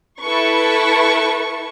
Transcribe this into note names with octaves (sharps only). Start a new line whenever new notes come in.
E4 A4 B4 C#6